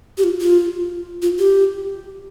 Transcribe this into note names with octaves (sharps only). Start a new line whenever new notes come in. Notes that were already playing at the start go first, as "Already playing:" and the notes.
G4
F4
F4
F4
G4